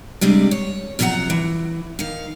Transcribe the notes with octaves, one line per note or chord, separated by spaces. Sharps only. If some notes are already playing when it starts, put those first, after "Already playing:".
G2 C3 G3 G#3
C#5
F#2 C3 F3 F4 F#5 A#5
E3
D#3 F5